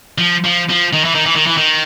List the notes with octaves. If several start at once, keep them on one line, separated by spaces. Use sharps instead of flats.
F3
F3
F3
D#3
E3
D#3
E3
D#3
E3
D#3